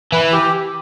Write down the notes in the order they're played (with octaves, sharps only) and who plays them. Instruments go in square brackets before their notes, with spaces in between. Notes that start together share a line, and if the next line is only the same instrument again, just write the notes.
[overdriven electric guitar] E3 [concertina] B4
[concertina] G4